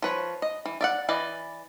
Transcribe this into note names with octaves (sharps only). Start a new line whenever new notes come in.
F3 B4 C#5
D#5
E3
D5 E5 F#5
E3 B4 D5 D#5